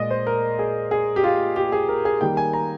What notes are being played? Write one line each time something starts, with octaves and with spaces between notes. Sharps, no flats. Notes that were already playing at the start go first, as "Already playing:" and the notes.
Already playing: A#2 G#3 D5 D#5
C5
A#4
G#4
G#4
G4
F4
G4
G#4
A#4
G#4
D#3 G3 A#3 G5
G#5
A#5